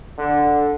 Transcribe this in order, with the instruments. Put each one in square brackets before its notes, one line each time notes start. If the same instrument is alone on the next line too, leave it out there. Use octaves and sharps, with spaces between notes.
[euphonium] D3